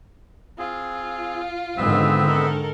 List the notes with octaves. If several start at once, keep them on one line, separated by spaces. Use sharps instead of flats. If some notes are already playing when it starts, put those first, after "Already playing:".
C4 F4 G#4
G#2 D3 D#3 B3 C4 E5
A4 A#4